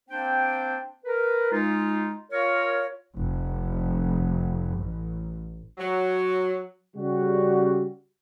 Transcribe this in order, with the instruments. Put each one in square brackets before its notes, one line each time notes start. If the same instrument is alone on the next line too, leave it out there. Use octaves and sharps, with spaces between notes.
[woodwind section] A#3 C4 D4 C5 G5
A#4 B4
G#3 D#4 F4
F4 A#4 C#5
[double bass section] F1
A1
[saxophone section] F#3
[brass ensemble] C#3 G3 F#4